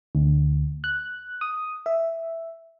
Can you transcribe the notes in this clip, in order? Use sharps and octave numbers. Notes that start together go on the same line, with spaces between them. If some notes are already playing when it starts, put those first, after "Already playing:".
D2
F#6
D#6
E5